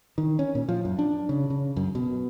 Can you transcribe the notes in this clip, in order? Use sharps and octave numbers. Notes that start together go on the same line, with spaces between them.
D#3
C#4
A#2
F3
F#2
D4
C#3
C#3
F#2
B2